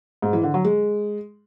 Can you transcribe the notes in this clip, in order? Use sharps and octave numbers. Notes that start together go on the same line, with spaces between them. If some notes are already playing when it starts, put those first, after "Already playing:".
G#2
E3
D3
F#3
G#3